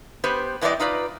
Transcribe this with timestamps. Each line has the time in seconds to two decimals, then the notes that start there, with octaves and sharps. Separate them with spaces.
0.24 B3 G4 B4 C5
0.61 E2 E3 G3 G#3 D5 D#5
0.80 D#4 F4 B4 D5